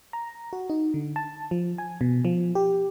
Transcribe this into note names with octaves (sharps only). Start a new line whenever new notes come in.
A#5
F#4
D#4
D3
A5
F3
G#5
B2
F3
G4